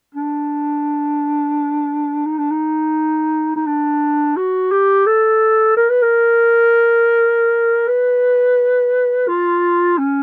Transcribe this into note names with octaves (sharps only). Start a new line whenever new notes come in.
D4
D#4
D4
D#4
D#4
D4
F#4
G4
A4
A#4
B4
A#4
B4
F4
C#4